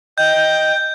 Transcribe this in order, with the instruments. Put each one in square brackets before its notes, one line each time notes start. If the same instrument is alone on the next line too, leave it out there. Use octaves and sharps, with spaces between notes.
[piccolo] D#5 [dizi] G5 [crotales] G6